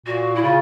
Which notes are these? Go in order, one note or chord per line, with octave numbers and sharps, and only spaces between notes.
A#2 F#4
E4
C#3 F4